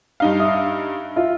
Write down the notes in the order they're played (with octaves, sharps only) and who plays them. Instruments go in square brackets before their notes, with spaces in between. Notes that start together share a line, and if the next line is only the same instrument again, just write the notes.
[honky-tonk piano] G2 D#4 F5
[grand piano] E5 D#6
F4 E5